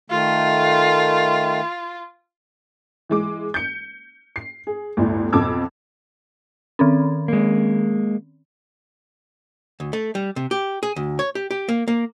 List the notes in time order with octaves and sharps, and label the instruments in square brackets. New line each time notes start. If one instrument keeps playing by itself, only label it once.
[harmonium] D#3 A3 [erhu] F4
[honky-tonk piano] E3 G#3 D6
G6 C#7
C7
G#4
G1 D2 A2
B1 F2 A5 D6 E6 G#6
[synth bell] D#3 C4 C#4
[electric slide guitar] G#3 A#3
[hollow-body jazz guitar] D2
A3
G3
C3
G4
G#4
D2
C#5
G4
G4
A#3
A#3